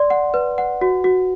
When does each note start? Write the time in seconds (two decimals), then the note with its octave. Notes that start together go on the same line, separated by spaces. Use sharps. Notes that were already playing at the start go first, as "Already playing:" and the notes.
Already playing: D5 C6
0.10 F#5
0.34 B4
0.58 F#5
0.81 F#4
1.04 F#4